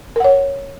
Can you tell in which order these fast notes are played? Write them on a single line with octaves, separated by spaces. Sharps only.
A#4 F#5 C#5